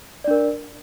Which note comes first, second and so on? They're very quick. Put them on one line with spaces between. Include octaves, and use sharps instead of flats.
D5 D4 A#4